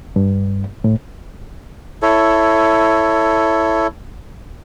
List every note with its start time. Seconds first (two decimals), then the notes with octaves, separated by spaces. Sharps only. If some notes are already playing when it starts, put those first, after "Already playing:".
0.16 G2
0.84 A2
2.02 E4 A4 C#5